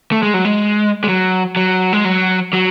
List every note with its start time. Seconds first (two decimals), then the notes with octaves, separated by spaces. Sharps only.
0.12 A3
0.23 G#3
0.34 F#3
0.45 G#3
1.04 G#3
1.08 F#3
1.56 F#3
1.93 G#3
2.05 F#3
2.53 F#3